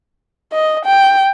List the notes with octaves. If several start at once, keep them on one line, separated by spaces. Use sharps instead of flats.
D#5
G5